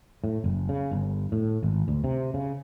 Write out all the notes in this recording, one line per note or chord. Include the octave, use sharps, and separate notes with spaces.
A2
F#1
C#3
G1
A2
G#1
D2
C3
C#3